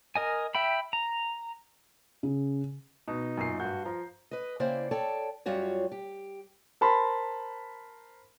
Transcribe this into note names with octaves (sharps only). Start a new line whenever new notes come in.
A#4 D#5 G#5
E5 G5 B5
A#5
C#3
B2 D#4
F#2 A#2 C7
G2 F#4 G6
F3 A#5
B4 D#5
C#3 A#3 E4 C5 D5 G5
A4 C#5 D5 G5 A5
F#2 G3 F4 F#4 C#5
G4
A#4 C5 A5 B5 C6